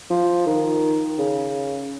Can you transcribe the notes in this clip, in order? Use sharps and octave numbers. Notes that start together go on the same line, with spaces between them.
F3
D#3
C#3